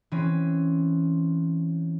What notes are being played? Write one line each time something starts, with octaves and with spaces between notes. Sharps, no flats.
E3 C4 C#4